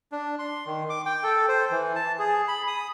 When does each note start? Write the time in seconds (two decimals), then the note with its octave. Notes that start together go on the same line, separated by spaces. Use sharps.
0.12 D4
0.39 C6
0.66 D#3
0.90 D6
1.06 G5
1.24 A4
1.49 C5
1.71 E3
1.95 A5
2.19 G#4
2.48 B5
2.68 D#6